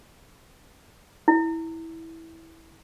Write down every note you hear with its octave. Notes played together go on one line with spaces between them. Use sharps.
E4